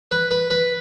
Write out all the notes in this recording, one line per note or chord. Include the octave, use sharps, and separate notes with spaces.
B4
B4
B4